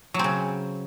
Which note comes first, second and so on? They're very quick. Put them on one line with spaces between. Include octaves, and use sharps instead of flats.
F#3 C4 C#3